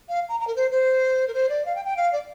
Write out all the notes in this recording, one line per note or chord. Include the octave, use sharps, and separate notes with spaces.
F5
A#5
A#5
A#4
C5
C5
A#4
C5
D5
F5
G5
G5
F5
D5